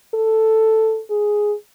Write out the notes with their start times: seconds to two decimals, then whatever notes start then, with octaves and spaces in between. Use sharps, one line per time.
0.14 A4
1.10 G#4